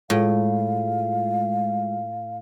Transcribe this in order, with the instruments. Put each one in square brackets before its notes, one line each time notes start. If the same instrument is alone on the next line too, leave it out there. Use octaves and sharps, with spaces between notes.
[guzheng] A2 [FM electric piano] G#3 F4 [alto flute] F5